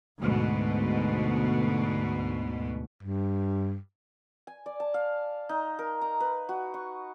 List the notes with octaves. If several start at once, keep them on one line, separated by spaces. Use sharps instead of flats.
D2 G#2 B2
G2
G#5
D5
A5
F5
D#4
A#4
A#5
B4
F#4
C#6